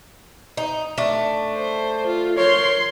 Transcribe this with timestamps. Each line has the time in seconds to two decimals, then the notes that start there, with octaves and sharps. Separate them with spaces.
0.57 D#4
0.98 A3 D4
1.55 C5
2.06 F4
2.38 F3 A#4 C#5 C6